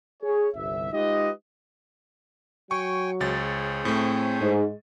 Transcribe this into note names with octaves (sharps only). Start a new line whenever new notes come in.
G#4 C#5
G1 C2 E5
G#3 D#4 F4 G4 B4 D#5
F#3 G5 G#5 C#6
C#2 G#4 C5 C#5 A6
A2 A3 C4
G#2 G#3